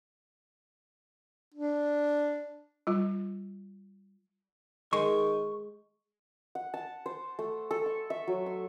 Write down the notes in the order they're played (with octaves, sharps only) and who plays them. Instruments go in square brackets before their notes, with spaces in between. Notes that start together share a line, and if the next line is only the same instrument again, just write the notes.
[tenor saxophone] D4
[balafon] G3 F4
[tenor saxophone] D#3 [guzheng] G#3 [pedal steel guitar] C#6
[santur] F#5
A5
C5
A3
A4
C#6
E5
F#3
C6